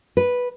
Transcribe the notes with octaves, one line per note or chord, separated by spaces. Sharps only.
B4